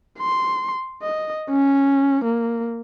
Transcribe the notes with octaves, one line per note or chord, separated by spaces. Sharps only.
C6
D#5
C#4
A#3